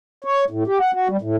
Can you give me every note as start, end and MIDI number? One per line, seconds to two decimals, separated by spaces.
0.24 0.45 73
0.50 0.64 45
0.67 0.78 67
0.80 0.91 78
0.93 1.08 66
1.09 1.17 55
1.22 1.36 45